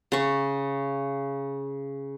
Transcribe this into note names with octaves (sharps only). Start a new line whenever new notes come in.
C#3 C#6